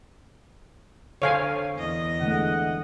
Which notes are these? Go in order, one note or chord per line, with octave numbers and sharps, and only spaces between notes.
D3 A4 C5 C#5 F5 G#5
E2 D#5
D3 G#3 A3 F#5